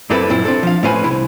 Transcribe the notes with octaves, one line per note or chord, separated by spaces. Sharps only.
F#2 A#3 C4 E4 A4 B4
F#2 A#2 C4 E4
C4 D4 A4
F3 F5
A2 A3 C#4 B4 C5 G#5
C2 C#3 E4